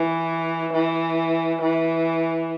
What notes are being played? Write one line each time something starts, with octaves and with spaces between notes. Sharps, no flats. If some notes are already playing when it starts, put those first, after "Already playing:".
Already playing: E3
E3
E3